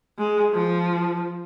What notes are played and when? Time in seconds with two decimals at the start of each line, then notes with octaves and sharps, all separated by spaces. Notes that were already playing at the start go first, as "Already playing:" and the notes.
0.18 G#3
0.53 F3